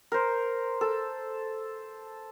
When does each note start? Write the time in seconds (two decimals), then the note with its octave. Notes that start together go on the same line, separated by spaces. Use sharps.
0.12 A#4 C5
0.81 A4